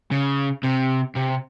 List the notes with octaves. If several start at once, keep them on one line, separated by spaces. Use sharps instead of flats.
C#3
C3
C3